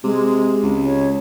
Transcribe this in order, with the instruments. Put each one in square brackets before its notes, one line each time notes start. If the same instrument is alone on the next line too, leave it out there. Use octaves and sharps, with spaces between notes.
[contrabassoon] C3 [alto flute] G#3
[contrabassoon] C#2
[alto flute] C#5